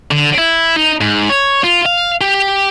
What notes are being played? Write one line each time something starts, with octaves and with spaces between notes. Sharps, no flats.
D3
E4
D#4
G#2
C#5
F4
F5
G4